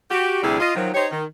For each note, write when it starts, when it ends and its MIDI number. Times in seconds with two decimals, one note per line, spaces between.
0.11 0.40 66
0.11 0.40 67
0.43 0.58 38
0.43 0.58 48
0.43 0.58 55
0.43 0.58 62
0.43 0.58 64
0.43 0.58 68
0.60 0.72 65
0.60 0.72 75
0.75 0.90 51
0.75 0.90 53
0.75 0.90 54
0.94 1.07 63
0.94 1.07 67
0.94 1.07 72
0.94 1.07 73
1.12 1.24 51